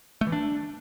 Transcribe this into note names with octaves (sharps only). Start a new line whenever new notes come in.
A3
E3
D4